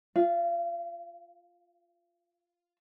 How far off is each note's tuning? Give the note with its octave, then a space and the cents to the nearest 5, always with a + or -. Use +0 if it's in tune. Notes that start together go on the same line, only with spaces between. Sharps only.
F4 +0 F5 -35